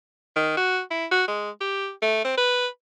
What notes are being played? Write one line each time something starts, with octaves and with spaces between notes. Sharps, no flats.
D#3
F#4
E4
F#4
G#3
G4
A3
C4
B4